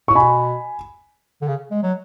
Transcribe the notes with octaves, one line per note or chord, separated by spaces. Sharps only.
A2 C#6
B2 G#5 B5
D3
C#3
G#3
F#3